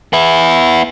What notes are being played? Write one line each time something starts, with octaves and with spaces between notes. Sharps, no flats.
B3 E4